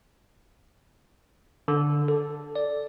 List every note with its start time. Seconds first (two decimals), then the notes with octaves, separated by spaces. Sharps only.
1.68 D3
2.08 A4
2.56 D5